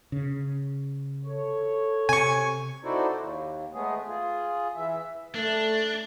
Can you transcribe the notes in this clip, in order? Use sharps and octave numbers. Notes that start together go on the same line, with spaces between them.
C#3
A4 C#5
C3 G#5 C#6
D#4 E4 F#4 A4 C5 D5
D#2
G#3 A3 B3 G#4
F4 G#4
E3 E5
A3 D4